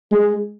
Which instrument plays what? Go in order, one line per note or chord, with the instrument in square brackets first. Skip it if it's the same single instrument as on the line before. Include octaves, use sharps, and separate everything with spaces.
[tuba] G#3